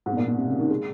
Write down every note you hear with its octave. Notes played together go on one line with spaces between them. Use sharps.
G#2
B2
A#2
B2
C3
C#3
D#3
G#3